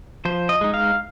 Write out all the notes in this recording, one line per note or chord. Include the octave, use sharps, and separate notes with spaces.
F3 C5
D#5
G#3 D#4
F5